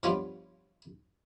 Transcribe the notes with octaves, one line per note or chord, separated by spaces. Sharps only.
G2 F3 B3 C#4 D4 F4